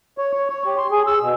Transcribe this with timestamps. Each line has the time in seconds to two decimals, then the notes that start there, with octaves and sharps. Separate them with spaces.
0.18 C#5
0.33 C#5
0.50 C#5
0.66 G4
0.78 C6
0.91 G#4
1.07 E6
1.22 B2